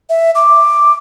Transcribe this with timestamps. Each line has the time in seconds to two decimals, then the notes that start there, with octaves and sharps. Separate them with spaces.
0.09 E5
0.35 D6